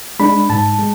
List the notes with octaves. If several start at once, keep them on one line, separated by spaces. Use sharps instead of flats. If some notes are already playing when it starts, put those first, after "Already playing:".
G#3 D4 B5
G#2 A5
G#3